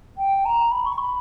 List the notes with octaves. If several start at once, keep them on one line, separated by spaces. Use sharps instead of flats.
G5
A#5
B5
C#6
B5